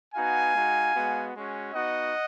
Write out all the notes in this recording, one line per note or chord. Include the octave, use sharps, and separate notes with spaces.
B3 D#4 F#4 F5 G#5
G#3 D#4 F#4
G#3 B3 F#4
G#3 C#4 F#4
B3 D#4 F#4 D#5 F#5